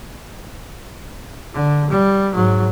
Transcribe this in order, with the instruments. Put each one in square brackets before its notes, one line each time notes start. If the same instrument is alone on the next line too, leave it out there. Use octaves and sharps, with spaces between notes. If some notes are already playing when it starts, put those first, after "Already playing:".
[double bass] D3
G3
G#2 F#3